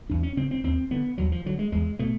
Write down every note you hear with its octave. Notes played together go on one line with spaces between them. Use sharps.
E2 D4
C#4
C#3 C4
C4
D#2 C4
D3 B3
D#2 F#3
F3
D3 F#3
G#3
E2 G#3
B2 A3